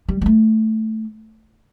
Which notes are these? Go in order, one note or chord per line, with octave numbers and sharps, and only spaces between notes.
G3
G3
A3